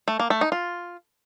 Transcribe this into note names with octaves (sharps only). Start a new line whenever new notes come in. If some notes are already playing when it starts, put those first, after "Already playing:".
A3
A#3
A3
D#4
F4